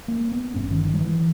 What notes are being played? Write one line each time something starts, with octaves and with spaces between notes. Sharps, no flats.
A#3
B3
G#1 G2 C#4
D#3
D#3
G3
E3